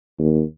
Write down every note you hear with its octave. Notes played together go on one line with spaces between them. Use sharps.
D#2